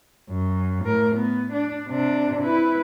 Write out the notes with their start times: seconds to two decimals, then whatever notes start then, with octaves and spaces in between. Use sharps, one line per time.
0.29 F#2
0.85 A2 A#4
1.16 B3
1.53 D4
1.88 C3 D4
2.42 E4 B4